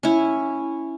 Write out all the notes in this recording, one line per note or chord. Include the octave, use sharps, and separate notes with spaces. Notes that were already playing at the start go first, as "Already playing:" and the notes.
C#4 E4